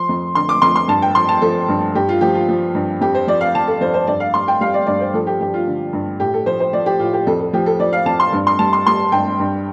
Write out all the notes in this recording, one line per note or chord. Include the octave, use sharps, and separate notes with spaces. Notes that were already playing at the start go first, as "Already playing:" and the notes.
Already playing: F3 C6
F2
D3 C6
D6
F2 C6
C6
G2 A5
G5
F3 C6
A5
F3 A4
G2
G2 G4
F4
F3 G4
F4
F3
G2
F2 G4
C5
F3 D5
F5
F3 A5
A4
F2 C5
C5
G2 D5
F5
G3 C6
G5
G3 F5
D5
G2 D5
C5
F3 A4
G4
G2 G4
F4
D3
G2
A2 G4
A4
F3 C5
C5
F3 D5
G4
A2 F4
G4
F2 A4
A4
F3 G4
A4
F3 D5
F5
F2 A5
C6
G2
C6
G3 A5
C6
G3 C6
G2 G5
G2